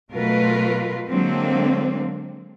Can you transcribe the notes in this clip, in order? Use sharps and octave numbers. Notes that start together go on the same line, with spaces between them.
B2 F#3 A3 F4 A#4 B4
D3 F#3 G#3 A#3 C4 D4